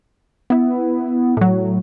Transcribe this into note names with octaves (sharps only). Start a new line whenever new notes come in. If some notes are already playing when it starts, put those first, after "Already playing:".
B3 E4
A2 F#3